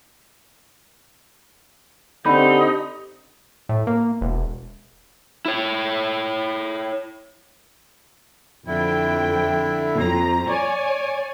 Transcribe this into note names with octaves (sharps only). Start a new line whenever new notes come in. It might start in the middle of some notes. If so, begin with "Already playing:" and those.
D3 C4 D#4 G4 B5
A2
A#3
E1
E4 C#5
F2 D3 E4 G5
F2 A#5
C#5 D5 G#5